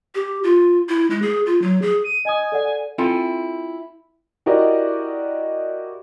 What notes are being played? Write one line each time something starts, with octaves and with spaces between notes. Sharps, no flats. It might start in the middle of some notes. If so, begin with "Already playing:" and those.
G4
F4
E4
G#3
G#4
F4
F#3
G#4
D#7
D#5 G#5 D#6
A4 D5 F#5
C4 E4 F4 A4 G#5
E4 F#4 G4 A#4 D5 D#5